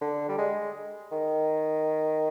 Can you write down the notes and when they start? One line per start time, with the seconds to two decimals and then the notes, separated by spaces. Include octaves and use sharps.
0.01 D3
0.29 G3
0.38 G#3
1.12 D#3